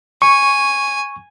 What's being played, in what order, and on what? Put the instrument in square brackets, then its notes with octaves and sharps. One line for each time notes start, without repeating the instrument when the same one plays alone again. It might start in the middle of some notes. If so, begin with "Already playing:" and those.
[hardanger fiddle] G#5 [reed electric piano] C#6